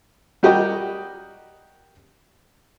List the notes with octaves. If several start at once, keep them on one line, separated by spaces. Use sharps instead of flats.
G3 F#4 G4 A#4 D#5 G5